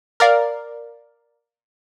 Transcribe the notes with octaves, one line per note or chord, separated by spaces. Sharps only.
A#4 D5 F5